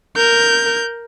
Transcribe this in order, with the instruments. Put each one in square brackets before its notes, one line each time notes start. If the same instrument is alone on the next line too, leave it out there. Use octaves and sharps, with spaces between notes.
[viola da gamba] A#4 [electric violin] G6